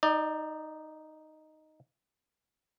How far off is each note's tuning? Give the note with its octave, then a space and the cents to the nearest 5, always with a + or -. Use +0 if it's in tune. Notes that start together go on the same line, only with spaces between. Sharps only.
D#4 +0 D5 +30